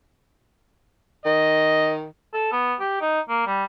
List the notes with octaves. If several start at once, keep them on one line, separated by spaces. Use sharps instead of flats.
D#3 D#5
A4
B3
G4
D#4
A#3
G3